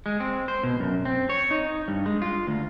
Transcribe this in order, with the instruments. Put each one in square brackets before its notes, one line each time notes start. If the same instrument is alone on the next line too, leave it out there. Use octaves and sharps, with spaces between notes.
[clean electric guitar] G#3
C4
C5
B2
F#2
C4
C#5
D#4
G2
G#3
F4
D2